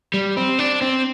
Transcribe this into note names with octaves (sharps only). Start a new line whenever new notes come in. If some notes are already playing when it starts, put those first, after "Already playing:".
G3
C4
D4
C4